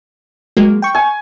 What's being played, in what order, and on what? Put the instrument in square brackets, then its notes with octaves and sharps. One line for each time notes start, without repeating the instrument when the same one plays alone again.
[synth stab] F#3 G#3 A#3
G5 C#6
[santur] G#5